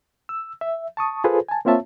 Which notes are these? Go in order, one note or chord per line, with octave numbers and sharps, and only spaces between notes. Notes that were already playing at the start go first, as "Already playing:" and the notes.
E6
E5
A5 C#6 D#6
F4 G#4 A4 B4 C5
G#5 A5
A#3 C4 F4 C#5 E5 A5